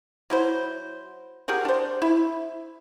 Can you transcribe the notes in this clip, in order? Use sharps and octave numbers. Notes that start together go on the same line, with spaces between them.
F#3 E4 C5
G4 G#4 A#4 F#5
D4 C5
E4